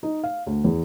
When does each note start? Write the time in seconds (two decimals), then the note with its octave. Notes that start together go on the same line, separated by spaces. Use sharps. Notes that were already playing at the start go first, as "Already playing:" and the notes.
0.03 D#4
0.24 F5
0.47 D2
0.64 E2